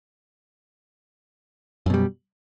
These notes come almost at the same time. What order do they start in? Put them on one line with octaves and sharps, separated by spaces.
F#2 B2 G3